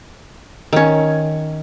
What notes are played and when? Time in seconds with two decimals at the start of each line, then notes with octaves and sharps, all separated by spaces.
0.73 D#3 C#4